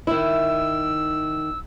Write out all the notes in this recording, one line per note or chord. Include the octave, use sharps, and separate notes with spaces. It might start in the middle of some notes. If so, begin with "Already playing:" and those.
D#3 E4 E6